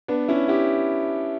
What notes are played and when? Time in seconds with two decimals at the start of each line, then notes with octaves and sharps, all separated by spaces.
0.08 B3 D4
0.28 C#4 E4
0.48 E4 G4